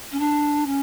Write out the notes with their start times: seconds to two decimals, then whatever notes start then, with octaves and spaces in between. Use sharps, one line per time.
0.11 C#4
0.19 D4
0.66 C#4